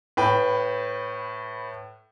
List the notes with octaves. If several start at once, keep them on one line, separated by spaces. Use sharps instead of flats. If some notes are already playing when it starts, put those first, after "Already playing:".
A2 B4 G5